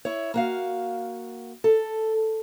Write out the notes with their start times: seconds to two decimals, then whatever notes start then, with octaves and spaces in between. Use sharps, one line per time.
0.05 E4 C#5
0.34 A#3 F#4 F5
1.64 A4